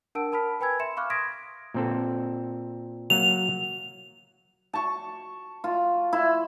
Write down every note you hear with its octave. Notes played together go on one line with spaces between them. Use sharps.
D4 A#4 F#5 A5 E6 D7
A#4 A5 B5 F6 B6
B4 G5 G#5 B5 E6 G#6
E5 C6 C#7 E7
F5 B5 C#6 D6 F6 F#6
C6 D#6 G#6 A#6 B6 D7
A#2 C4 A4
F#3 A#3 F#5 F7
A5 C#6
F4
E4